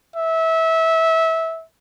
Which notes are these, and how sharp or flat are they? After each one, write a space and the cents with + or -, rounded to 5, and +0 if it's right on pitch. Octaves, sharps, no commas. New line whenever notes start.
E5 -20